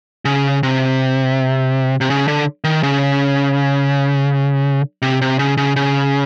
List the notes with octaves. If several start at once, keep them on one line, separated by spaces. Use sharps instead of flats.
C#3
C3
C3
C#3
D3
D#3
C#3
C3
C3
C#3
C#3
C#3